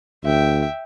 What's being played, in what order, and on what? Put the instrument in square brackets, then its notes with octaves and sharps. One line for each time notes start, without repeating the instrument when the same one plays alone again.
[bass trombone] D2 [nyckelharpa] E5 G5